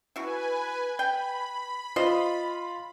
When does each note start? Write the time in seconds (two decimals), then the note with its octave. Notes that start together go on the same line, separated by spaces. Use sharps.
0.16 E4 F#4 B4 G#5
0.99 G5 B5
1.96 F4 C5 D#5